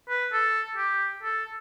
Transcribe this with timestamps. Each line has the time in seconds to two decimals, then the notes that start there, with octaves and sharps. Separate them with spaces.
0.09 B4
0.33 A4
0.77 G4
1.23 A4